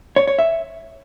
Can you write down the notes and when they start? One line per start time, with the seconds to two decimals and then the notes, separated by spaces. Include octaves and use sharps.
0.16 C#5
0.27 C#5
0.38 E5